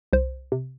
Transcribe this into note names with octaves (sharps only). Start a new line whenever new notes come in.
C2 C5
C3